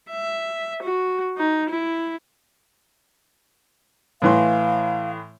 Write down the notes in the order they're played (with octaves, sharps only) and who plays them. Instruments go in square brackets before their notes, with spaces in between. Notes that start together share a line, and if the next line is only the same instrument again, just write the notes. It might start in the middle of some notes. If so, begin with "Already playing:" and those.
[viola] E5
F#4
D#4
E4
[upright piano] A2 E3 C6 [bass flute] F5